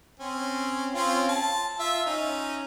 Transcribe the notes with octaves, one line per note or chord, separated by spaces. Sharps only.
C4 C#4
C4 C#4 F4
A5
F4 E5
C#4 D#4